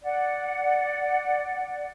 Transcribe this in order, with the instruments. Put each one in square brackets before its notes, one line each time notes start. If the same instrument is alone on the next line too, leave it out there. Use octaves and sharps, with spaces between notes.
[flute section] D5 F#5